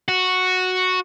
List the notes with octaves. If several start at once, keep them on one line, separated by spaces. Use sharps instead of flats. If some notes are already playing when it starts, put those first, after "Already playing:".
F#4